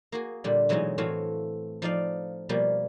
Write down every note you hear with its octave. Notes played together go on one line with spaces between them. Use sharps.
A#3 F#4 G#4
A#2 D3 G3
B2 E3 F#3 G#3 D#4 F#4
A2 E3 A3 C4 F#4 F5
F3 D#4 D5 F5
B2 F3 G3 A#3